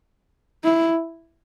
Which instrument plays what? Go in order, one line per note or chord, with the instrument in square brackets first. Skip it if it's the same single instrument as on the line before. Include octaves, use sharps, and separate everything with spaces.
[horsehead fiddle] E4